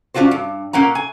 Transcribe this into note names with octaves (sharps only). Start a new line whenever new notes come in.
C#4 D4 F4 F#4 C5
G2
A#2 A#3 C#4 F#5 A#5
G#5